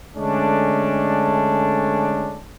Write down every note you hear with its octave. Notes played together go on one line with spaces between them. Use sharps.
D3 G#3 A3 C#4 D4